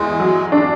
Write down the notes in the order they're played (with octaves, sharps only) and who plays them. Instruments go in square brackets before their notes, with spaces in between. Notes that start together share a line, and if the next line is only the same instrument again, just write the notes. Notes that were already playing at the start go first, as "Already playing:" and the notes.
Already playing: [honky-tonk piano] E2 [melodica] G#3
[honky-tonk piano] F#3
D4